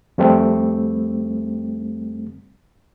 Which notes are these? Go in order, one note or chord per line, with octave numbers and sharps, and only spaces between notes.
F2 G3 A3 C4